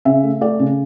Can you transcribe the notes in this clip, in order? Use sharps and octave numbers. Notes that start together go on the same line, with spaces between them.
C#3 E5
A3
A3 D5
C#3